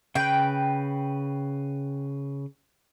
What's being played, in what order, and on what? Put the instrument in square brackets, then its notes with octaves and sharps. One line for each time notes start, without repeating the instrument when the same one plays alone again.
[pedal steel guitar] C#3 B4 [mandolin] G5